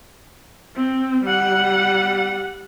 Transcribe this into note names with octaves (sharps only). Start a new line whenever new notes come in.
C4
G3 F#5